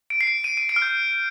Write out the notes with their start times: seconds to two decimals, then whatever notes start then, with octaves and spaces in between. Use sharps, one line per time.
0.10 D7
0.21 C7
0.27 D7
0.44 D#7
0.57 D#7
0.69 D7
0.76 F6
0.82 G6